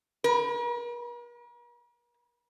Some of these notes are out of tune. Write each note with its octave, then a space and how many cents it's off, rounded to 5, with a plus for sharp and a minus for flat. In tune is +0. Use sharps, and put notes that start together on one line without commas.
A#4 +45